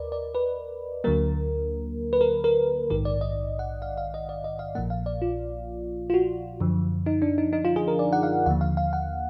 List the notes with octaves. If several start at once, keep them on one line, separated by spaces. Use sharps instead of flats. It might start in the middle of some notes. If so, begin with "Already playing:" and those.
Already playing: D#2 A#4 B4 D5 D#5
D5
B4
D2 D3 F#3 A#3 A#4
B4
A#4
A#4
A#1 G#2 D#3 A#4
D5
D#5
F#5
F5
F5
D#5
D5
D#5
F5
A#1 A#2 F3 A#3 F#5
F5
D5
F4
F4
F#4
F#2 D3 F3
D#4
D4
D#4
D#4
F4
G#4
A#4
D5
F#5
F5
D#2 D3 F3 A#3 F#5
F5
F5
F#5